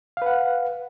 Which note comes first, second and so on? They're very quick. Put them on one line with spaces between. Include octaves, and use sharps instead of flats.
F5 B4 F#5